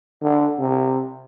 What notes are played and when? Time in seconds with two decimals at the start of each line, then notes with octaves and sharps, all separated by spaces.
0.22 D3
0.59 C3